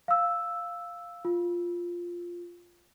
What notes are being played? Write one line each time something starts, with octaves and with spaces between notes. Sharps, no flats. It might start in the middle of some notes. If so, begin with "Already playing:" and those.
F5 E6
F4